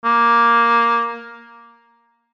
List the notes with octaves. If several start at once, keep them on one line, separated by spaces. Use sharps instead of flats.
A#3